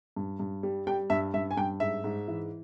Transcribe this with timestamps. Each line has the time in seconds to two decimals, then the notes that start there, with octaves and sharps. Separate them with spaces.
0.16 G2
0.39 G2
0.63 G3
0.87 G3 G5
1.10 G2 E5
1.34 G2 E5
1.51 G#5
1.57 G2 G5
1.80 G#2 E5
2.04 G#2
2.28 E3